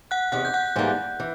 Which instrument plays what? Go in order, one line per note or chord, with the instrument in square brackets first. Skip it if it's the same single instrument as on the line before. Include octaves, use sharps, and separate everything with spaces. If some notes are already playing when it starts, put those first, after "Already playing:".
[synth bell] F#5 F#6
[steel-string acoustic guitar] E2 C3 D#3 [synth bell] F#5 F#6
[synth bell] G6
F#5 F#6
[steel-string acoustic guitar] G#2 E3 G3 A#3
E3